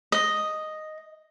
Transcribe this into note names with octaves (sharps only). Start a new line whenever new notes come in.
D#5